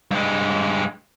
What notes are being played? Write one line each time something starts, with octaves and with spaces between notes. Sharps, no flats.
G2 G#3